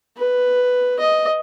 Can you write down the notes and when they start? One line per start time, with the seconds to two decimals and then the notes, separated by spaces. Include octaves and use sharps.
0.17 B4
1.00 D#5